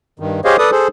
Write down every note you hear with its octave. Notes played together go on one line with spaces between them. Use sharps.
G2 D#3
G4 G#4 C5 C#5 D#5 F5
A4 B4 D5 D#6
G#4 A4 C5